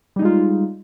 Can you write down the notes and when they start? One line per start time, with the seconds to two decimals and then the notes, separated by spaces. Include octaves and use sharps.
0.16 G3
0.19 D#4
0.22 G#3
0.25 F4